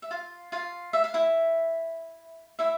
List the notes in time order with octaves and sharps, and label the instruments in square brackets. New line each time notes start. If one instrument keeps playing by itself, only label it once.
[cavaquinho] E5
F4 F5
F4 F5
E5
F5
E4 E5
E4 E5